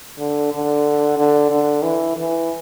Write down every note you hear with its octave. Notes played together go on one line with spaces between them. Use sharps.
D3
D3
D3
D3
E3
E3